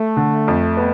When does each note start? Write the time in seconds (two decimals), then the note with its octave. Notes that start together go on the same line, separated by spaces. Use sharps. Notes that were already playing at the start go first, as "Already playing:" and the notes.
Already playing: A3
0.17 D3
0.48 F2
0.77 B3